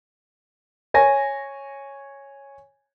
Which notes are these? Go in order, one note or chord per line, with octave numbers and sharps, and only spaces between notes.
C#5 G#5 A#6